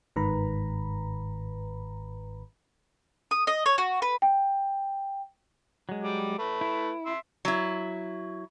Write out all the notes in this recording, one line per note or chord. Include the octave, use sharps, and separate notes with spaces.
G1 G#2 D#3 B4 A#5 B5
D#6
D#5
C#5
F#4
B4
G5
F#3 G#3
G3 D6
A3 B4
E4
E5 C6
F#3 E4